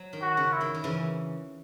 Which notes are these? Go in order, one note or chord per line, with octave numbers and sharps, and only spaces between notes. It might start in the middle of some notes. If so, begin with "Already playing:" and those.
Already playing: F#3
D#3
F#4
C#3
E4
D#3
D#3
C#3 E3